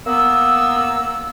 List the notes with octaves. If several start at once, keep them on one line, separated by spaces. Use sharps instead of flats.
A#3 B3 E6